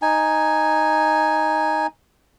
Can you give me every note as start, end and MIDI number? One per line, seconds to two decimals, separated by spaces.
0.02 1.87 63
0.02 1.87 80